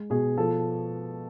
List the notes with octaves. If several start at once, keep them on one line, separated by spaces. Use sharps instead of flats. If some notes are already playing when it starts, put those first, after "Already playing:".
Already playing: G#3
B2 G#4
F3 A4